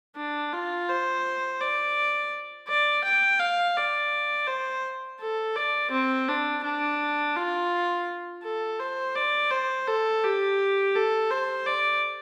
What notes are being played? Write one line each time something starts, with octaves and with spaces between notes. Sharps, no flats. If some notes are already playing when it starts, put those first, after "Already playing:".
D4
F4
C5
D5
D5
G5
F5
D5
C5
A4
D5
C4
D4
D4
F4
A4
C5
D5
C5
A4
G4
A4
C5
D5